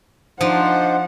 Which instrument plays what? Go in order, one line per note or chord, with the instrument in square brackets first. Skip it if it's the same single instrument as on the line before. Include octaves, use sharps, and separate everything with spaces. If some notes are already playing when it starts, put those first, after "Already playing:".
[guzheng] F3 [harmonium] D4 D#4 C5 [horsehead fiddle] F#5